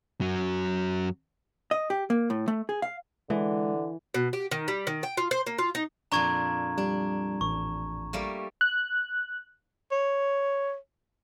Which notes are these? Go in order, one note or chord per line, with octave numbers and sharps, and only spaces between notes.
F#2 F#3
D#5
G4
A#3
A2
A3
G#4
F5
D3 E3 G#3
B2
G4
D#3
G3
D#3
G5
F4
C5
A#3
F4
D#4
F2 A#2 D4 A#5 C#6 G#6
G3 D4
A1 C#6
G3 A3 A#3
F#6
C#5